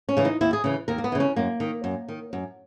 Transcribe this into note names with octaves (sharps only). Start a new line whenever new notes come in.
C#4
C#3 E3
D#4
D#2 E4
G#4
C#3 E3
D#2 A#4
A#3
B3
C#3 E3
C#4
F#2 A#3
D#3
F#2
D#3
F#2